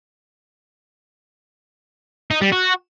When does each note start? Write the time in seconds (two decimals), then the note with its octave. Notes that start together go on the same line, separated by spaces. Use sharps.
2.31 D#4
2.41 G3
2.52 F#4